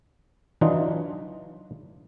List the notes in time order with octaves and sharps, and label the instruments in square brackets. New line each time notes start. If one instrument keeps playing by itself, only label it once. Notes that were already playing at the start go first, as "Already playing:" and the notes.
[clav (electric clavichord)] E3 F#3 D4 D#4 F4